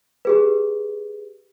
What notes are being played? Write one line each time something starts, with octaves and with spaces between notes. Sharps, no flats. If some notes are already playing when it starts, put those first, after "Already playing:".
G4 G#4 B4